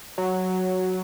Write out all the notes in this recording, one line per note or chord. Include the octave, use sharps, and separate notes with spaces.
F#3